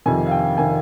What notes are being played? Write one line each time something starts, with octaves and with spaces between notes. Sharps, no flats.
F2 C3 D#3 G#5
F5
G5
C3 D#3 G#5